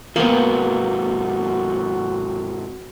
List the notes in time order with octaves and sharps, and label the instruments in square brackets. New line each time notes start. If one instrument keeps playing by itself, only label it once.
[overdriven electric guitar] G#2 C3 [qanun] A#3 B3 [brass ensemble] F#4